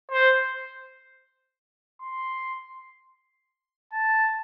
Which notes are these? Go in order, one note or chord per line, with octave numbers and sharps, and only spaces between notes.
C5
C6
A5